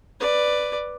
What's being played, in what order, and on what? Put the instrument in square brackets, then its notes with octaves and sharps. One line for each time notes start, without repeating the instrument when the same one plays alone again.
[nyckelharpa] B4 D5